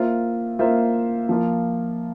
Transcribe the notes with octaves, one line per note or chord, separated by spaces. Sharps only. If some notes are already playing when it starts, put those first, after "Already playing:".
Already playing: A#3 F4 C5 E5
A#3 F4 C5 E5
F3 A#3 F4